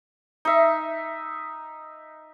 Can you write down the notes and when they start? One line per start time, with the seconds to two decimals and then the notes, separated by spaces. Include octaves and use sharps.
0.45 D#4 E5